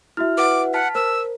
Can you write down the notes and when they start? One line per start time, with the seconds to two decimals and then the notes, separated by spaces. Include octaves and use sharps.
0.17 E4 F#4 E5 F6
0.38 B4 F#5 D6
0.74 F#5 A5 F6 B6
0.95 A#4 C5 E6